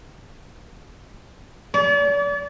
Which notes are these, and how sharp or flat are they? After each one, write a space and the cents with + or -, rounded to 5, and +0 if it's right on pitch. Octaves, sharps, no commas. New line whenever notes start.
D5 -40